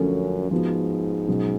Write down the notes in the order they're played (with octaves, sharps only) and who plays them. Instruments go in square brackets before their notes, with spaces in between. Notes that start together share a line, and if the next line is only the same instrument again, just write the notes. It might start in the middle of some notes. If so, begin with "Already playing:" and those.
Already playing: [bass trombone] F#2 [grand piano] D3 F3 A3 C#4
[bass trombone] G#2 [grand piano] F3 B3 F#4
[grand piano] B2 F#3 C#4 F#4